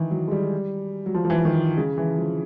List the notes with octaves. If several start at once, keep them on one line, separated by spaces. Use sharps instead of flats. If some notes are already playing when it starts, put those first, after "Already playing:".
Already playing: D#3 E3
F#3
G#3
G3
F#3
F3
F3
E3
D#3
C#3
E3
F3